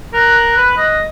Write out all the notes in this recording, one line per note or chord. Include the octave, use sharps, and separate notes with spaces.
A#4 F#6
B4
D#5